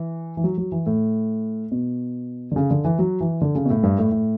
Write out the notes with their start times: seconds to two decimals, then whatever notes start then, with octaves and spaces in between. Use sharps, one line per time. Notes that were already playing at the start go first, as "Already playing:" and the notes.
Already playing: E3
0.37 E3
0.44 F#3
0.58 F#3
0.72 E3
0.86 A2
1.72 B2
2.51 D3
2.56 C#3
2.71 D3
2.85 E3
2.99 F#3
3.21 E3
3.41 D3
3.55 C#3
3.65 B2
3.70 A2
3.83 G2
3.98 A2
4.12 A2